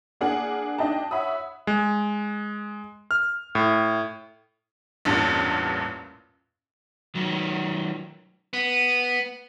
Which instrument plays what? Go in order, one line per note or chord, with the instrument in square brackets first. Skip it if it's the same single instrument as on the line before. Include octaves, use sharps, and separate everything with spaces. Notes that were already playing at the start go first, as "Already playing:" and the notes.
[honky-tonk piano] A#3 D4 G#4 F#5
D4 D#4 D#5 G5 A5
C#5 E5 F#5 B5 D#6
[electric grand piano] G#3
F6
A2
[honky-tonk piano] A1 E2 G2 A#2
[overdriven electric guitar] D#3 F#3
B3